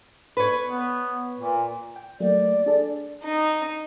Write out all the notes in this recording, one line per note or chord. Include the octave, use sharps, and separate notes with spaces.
B4 C#5
B3
A#2
G5
F#3 A3 A#3 D5
D4 G#4 A4
D#4